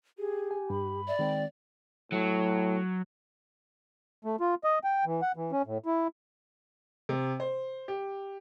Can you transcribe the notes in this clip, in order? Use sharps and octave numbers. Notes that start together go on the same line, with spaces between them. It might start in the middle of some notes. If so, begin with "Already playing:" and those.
G4 G#4
G#5
G2 B5
D5 E5
D#3 G#3 C4 G5
A2 F#3
A3
F4
D#5
G5
E3
F#5
E3
C#4
A2
E4
C3
C5
G4